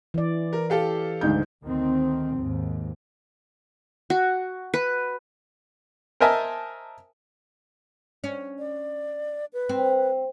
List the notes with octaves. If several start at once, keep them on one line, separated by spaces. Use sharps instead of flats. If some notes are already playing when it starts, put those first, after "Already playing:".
E3 D5
A#4
G4 A4 F5
D2 G#2 G6
D2 D#3 C4
D#2 G#2
F#4
B4
A#4 C5 D#5 E5 G#5 A5
C#4
D5
B4
C4